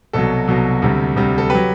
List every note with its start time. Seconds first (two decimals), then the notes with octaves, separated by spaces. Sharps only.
0.13 C2 B2 F#3 A4
0.48 C2 B2 F#3
0.82 D2 C3 G3
1.16 D2 C3 G3
1.38 A4
1.50 F#3 G4 B4